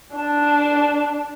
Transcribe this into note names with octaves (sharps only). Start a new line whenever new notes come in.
D4 A5